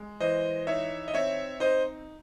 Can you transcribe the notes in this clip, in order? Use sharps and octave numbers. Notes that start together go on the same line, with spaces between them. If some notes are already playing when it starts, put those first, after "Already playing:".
Already playing: G#3
E3 C5 D#5
D#4 C#5 E5
D#5
C4 C#5 E5
D#4 C5 D#5